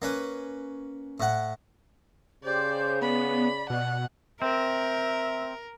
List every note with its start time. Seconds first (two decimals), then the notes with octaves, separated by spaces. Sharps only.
0.02 A#3 C#4 B4
1.20 A2 F#5
2.44 C#3 G4 C5 D5 G6
3.02 B3 D5 B5
3.70 B2 F#5
4.42 C4 A#4 E5